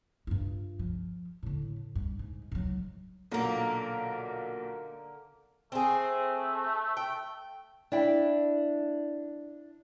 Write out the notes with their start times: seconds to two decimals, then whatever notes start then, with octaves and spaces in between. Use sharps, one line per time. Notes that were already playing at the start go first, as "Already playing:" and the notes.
0.27 G2 F4
0.79 F3
1.43 A2 D3
1.95 G2
2.19 G#2
2.52 G#2 F#3
3.32 B1 A#2 D3 A#3 A#4
5.72 A3 C4 G#4
6.97 G5
7.92 D4 E4 G5